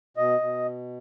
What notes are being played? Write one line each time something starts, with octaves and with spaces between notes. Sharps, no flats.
B2 D#5
B2